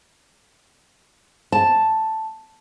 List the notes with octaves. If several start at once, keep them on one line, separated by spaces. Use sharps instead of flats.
A5